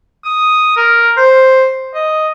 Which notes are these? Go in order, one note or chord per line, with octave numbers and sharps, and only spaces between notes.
D#6
A#4
C5
D#5